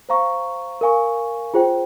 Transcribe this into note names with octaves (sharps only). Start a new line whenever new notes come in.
C5 F5 A#5 C#6
A#4 F5 G#5 C#6
F4 G#4 C5 G5